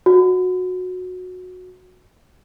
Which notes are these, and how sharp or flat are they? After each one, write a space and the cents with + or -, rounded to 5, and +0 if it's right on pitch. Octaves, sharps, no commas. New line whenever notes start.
F#4 -20